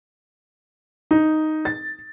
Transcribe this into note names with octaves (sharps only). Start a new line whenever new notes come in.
D#4
A6